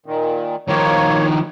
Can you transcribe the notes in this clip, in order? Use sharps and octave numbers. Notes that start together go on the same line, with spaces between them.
A#2 D#3
D#3 F3 A#3 C#5